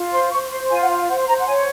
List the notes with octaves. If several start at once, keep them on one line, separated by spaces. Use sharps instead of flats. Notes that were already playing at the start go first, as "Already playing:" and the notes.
Already playing: F4
C5 C6
C5 C#6
C5 C6
F4 G#5
F#5
C5 F5
C5 F#5
C6
C5 A#5
F#5
C#5 G#5